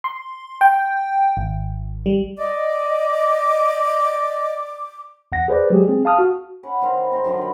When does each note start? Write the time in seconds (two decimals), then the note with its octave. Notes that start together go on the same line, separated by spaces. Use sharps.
0.04 C6
0.61 G5
1.37 G#1
2.06 G3
2.38 D5 D#5 D6
5.32 E2 F#5 A#6
5.48 G#4 B4 C5 D5
5.70 F#3 G#3 G4 G#4
5.88 C4 G#4
6.05 F5 A5 D#6 F6
6.19 F#4
6.63 C#4 B4 F#5
6.81 D#3 C4 C5 F5
6.97 E4
7.11 G#2 C4 A#5 C6
7.24 F#2 D3 D#3 F3
7.37 D4 B5